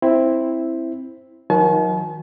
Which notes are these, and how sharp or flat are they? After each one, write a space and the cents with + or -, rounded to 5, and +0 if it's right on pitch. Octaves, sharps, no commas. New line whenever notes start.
C4 +5 E4 +0
D#3 +30 F#3 -35 A5 -45